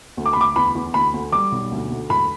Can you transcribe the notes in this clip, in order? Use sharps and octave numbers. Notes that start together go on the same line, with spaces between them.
D2
D6
B5
D2 D6
E2 B5
E2
D2 B5
D2
G3 D6
B1
D2
D2
E1 B5